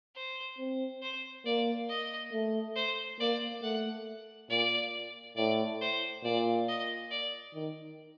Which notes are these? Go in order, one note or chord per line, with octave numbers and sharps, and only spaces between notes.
C5
C4
C5
A#3 D5
D#5
A3
C5
A#3 D5
A3 F#5
A#2 D5
A2 D5
C5
A#2 D5
D#5
D5
D#3